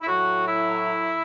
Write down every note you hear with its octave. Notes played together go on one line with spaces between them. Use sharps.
E4
A2 F#3 F#4
E4